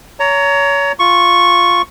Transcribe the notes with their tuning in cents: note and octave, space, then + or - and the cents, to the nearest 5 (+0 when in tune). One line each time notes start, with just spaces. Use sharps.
C#5 +25 A#5 -10
F4 +0 C#6 -5